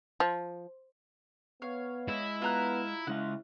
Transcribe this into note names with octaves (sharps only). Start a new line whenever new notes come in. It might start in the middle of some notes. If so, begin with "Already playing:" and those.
F3
B3 C#5 F5
G#3 E4
B3 F4 A#5 F#6
C#3 G#3 E4 F5 F#5